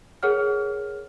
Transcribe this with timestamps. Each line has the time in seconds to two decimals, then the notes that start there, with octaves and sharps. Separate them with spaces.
0.23 G#4 A#4 C#5 F#5 F6